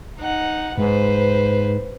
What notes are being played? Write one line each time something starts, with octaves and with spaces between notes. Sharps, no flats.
D#4 F#5
G#2 B4 C5